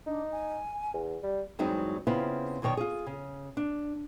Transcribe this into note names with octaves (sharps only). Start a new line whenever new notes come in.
D4 D#4
G#5
E2
G3
E2 G2 F#3 G#3 C4 D#4
C#3 B3 C4 E4 F4
F#2 B2 D#3 C#5 D5
F4 G#4
C#3
D4